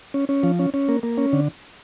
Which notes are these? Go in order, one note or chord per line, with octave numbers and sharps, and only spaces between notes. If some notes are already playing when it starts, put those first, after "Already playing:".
C#4
C#4
F3
C#4
C#4
A#3
A#3
C#4
D3